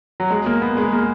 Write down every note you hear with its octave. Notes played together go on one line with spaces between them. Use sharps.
F#3
G#3
A#3
B3
G#3
A#3